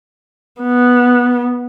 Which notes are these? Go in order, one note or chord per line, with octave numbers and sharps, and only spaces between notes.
B3